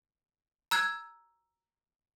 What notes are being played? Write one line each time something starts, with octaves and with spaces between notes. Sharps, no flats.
A#5 E6 F#6 G#6